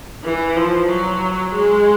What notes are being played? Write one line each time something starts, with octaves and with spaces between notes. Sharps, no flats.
E3
F3
F#3
G#3